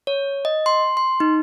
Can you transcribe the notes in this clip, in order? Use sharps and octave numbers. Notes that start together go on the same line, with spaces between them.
C#5
D#5
C6
C6
D#4